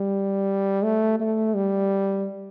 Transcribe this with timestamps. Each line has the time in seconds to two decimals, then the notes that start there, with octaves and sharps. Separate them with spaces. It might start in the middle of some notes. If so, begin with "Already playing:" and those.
Already playing: G3
0.84 A3
1.20 A3
1.55 G3